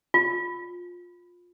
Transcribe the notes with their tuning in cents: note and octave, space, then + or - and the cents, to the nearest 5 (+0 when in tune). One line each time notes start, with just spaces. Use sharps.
F4 +15